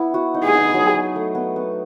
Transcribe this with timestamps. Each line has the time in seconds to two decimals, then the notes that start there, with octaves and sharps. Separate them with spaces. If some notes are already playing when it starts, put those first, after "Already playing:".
Already playing: B3 E4
0.14 F#4
0.34 D#4
0.44 G#4
0.55 D#4
0.74 F#3
0.94 D#4
1.16 A3
1.35 B3
1.56 B3